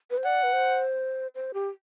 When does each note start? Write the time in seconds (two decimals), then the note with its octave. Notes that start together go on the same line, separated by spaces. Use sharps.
0.11 B4
0.18 C5
0.25 D5 F#5
0.43 B4
0.53 C5
1.35 C5
1.54 G4